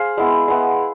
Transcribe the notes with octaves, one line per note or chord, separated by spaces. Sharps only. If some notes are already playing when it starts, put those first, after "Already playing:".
Already playing: G#4 C5 F5
G#3 B3 E4
G#3 B3 E4